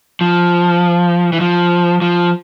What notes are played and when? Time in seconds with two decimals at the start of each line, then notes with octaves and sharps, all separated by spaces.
0.21 F3
1.33 E3
1.41 F3
2.02 F3